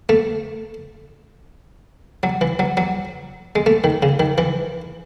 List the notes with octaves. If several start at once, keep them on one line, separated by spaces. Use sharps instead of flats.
A3
F#3
E3
F#3
F#3
G#3
A3
D#3
C#3
D#3
E3